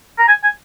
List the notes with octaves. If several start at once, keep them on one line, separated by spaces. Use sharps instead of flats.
A#5
G#5
G#5